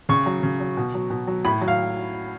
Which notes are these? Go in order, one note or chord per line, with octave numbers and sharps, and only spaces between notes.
C#3 C#6
F#3
C#3
F#3
B2
F#3
B2
F#3
A2 B5
F#3
F5